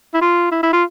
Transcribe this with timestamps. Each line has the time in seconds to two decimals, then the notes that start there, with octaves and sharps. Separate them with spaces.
0.14 E4
0.22 F4
0.52 E4
0.63 E4
0.73 F4